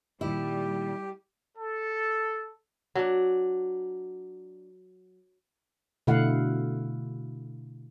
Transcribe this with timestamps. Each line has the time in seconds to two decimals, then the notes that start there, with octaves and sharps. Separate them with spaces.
0.21 A#2 D#3 F3 G3 E4 G4
1.56 A4
2.95 F#3 D4
6.07 B2 D3 A3 E4 F5 F#5